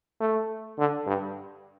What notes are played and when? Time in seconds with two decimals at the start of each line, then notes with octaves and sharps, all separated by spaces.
0.20 A3
0.79 D3
1.07 G2